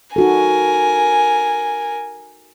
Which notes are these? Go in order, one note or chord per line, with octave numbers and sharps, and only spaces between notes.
D#4 F#4 A4 A#4 G#5